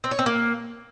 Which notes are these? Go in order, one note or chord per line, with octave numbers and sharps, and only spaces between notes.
C4
C#5
C4
A#3